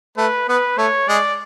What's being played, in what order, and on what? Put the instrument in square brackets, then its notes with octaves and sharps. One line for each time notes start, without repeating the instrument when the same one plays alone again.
[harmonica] A3 [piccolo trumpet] B4
[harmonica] B3 [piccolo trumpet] B4
[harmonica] A3 [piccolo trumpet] C#5
[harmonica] G#3 [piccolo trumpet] D5